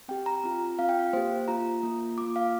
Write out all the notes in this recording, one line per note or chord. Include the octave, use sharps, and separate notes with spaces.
C4 G4 G5
A#5
C4 F4
C4 F4 F5
G5
F5
A#3 G4 C5
A#3 F4 A#5
A#3 F4
A#3 F4 D6
F5